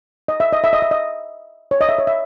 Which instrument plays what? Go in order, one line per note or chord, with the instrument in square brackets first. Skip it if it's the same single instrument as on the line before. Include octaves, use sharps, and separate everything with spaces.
[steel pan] D#5
E5
D#5
E5
D#5
E5
D#5
C#5
D#5
E5
C#5
E5